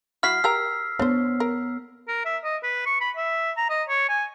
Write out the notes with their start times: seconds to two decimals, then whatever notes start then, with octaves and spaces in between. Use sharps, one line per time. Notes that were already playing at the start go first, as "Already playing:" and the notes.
0.23 F#3 E4 F#4 F6 B6 C7
0.44 G4 A#4 A#5 E6
0.99 B3 D4 C5 C#5
1.40 A#4
2.08 A#4
2.25 E5
2.44 D#5
2.63 B4
2.86 C#6
3.01 B5
3.17 E5
3.57 A#5
3.70 D#5
3.89 C#5
4.09 G#5